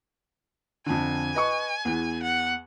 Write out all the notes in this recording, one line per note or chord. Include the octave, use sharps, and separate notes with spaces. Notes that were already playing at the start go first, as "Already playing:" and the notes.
F2 D3 G#5
B4 D#5 C#6
E2 E3
F#5